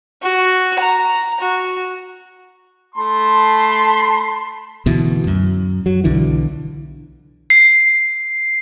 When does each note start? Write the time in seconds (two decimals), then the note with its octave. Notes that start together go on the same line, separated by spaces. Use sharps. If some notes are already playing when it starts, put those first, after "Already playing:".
0.22 F#4
0.79 A#5
1.40 F#4
2.95 A3 A5 B5 C6
4.86 D2 B2 E3
5.27 F#2
5.86 F#3
6.04 B1 D3 E3
7.50 C7